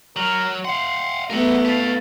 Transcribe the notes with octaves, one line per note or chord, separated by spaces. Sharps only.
F#3 A#4
F5 F#5 C6
A3 B3 E4 A#4 F#5
B4 F5 A5